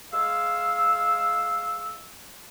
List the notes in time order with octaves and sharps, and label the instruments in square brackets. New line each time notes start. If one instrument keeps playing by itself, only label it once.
[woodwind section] G#3 F5 E6